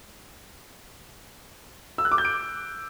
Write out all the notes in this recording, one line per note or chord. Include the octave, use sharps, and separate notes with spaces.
E6
F#6
D6
G6
D7